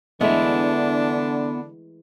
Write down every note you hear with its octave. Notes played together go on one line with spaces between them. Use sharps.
D3 E3 G#3 A3 B3 D4 E4